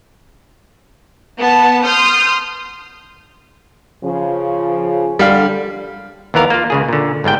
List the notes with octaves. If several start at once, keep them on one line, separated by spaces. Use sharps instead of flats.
B3 A5
C6 D#6 F6 G6
C#3 F3
D3 G3 F5
D#2 E3 B3 A#4 F5
A#3 F4
C#2 C#3 G#4
A#2 D3
G1 G#2 G3 G5